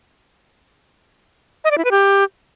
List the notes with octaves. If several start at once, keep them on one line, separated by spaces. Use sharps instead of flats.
D#5
D5
E4
B4
G4